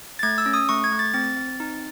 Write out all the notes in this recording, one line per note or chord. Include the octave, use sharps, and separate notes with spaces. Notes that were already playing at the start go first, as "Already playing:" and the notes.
A6
A3 G#6
E6
C#4
D#6
A3 C#6
G#6
A3
A6
C4 A6
C4
D#4